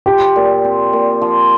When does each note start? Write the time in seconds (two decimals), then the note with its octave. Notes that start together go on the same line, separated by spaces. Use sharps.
0.06 F3 G4
0.36 A#2
0.64 C4
0.93 A#2
1.22 F3